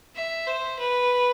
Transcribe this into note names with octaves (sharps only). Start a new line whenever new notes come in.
E5
C5
B4